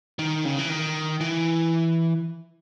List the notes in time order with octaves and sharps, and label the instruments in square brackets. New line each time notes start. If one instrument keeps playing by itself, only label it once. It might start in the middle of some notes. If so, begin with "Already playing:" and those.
[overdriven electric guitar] D#3
C#3
E3
D#3
E3